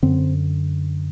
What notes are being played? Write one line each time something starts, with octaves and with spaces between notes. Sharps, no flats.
F#2 D3 C4